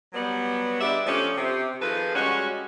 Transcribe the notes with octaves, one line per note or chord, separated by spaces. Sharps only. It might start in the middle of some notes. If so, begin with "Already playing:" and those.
F#3 G3 B3
G3 G#3 D4 D5 E5
F3 A3 C#4 D4 G4
C3
D#3 F3 G#4 A4 B4
G3 G#3 C#4 F#4